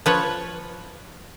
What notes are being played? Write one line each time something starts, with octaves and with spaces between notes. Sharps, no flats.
F3 B4 C#5